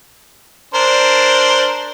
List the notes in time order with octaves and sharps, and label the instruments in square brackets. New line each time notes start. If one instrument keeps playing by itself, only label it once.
[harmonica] D4 A#4 C5